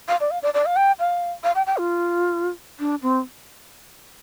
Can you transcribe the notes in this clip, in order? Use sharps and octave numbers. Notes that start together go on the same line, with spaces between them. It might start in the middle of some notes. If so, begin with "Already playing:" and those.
F5
D5
F5
D5
D5
F5
G5
F5
F5
G5
G5
F4
D4
C4